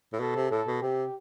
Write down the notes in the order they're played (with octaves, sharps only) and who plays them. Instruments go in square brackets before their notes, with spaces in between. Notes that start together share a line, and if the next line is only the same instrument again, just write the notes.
[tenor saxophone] A2
[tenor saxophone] B2 [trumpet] A4
[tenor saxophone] C3
[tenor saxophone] A2 [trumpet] A4
[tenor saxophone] B2
[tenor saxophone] C3 [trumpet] G4